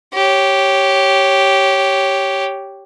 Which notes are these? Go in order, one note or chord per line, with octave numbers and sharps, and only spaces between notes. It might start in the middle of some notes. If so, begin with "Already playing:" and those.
G4 C#5